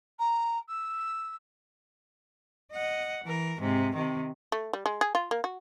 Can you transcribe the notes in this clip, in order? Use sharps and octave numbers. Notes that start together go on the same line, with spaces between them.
A#5
E6
D#5 F#5
E3 A#4
G#2 C3
C3 D#3
A3
G3
G#3
G#4
F4
A#3
F#4